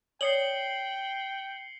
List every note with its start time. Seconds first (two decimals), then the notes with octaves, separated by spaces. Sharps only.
0.21 C#5 D5 G5 D#6 C7 C#7 F#7 G7